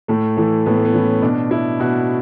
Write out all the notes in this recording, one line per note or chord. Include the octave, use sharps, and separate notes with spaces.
A2 A3
E3 A3
A2 B3
A3
B3
E3 C#4
B2 D4
E4
B2 F#4